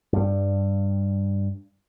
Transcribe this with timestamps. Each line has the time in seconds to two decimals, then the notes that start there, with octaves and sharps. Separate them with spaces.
0.13 G2 G3